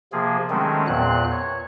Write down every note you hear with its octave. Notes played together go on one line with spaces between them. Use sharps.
C3 F3 A#3 G#4
D#3 F#3 G#3 A3 C4 C#4
E2 A#2 C4 F#6
C#5